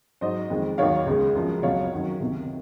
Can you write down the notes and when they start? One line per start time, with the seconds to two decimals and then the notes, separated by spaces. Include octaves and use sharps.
0.21 G#2 F#3 C5 D#5
0.50 F2 D#3 G#3
0.78 D#2 D#3 F#3 C#5 F5
1.07 C#2 C#3 G#3
1.35 F#2 F3 G#3
1.63 C#2 C3 F#3 C#5 F5
1.92 F#2 D#3 F#3
2.20 C#2 C3 D#3